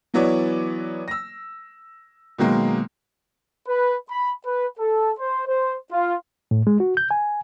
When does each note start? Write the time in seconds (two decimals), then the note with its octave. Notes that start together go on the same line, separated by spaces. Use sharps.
0.14 E3 F#3 B3 E4 C#5 D5
1.08 E6 A#6
2.38 B2 D#3 F#3 G#3 A#3
3.67 B4
4.09 B5
4.45 B4
4.79 A4
5.18 C5
5.47 C5
5.92 F4
6.51 A2
6.67 G#3
6.80 F#4
6.97 G6
7.11 G#5